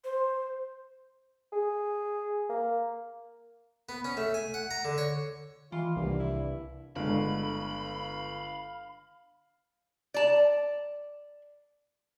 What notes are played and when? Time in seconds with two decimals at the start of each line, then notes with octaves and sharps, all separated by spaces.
0.04 C5
1.52 G#4
2.49 A#3
3.89 B3
4.05 C#4
4.17 A3
4.34 G#5
4.54 F#5
4.71 A#5
4.85 D3
4.98 C#5
5.72 D#3 E3 F4
5.96 C2 G2 A#3
6.19 E4
6.96 G1 D3 G#3 F5 B5
10.14 D5 A5